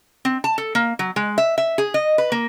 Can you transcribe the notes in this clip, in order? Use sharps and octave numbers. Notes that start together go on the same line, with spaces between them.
C4
A5
A4
A#3
F#3
G#3
E5
E5
G#4
D#5
B4
A#3